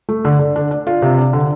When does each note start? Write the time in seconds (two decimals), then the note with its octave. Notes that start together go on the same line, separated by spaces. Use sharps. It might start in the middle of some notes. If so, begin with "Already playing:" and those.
0.09 A3
0.25 D3
0.39 D3
0.56 D4
0.71 D4
0.87 F4
1.02 C3
1.18 D4
1.33 D3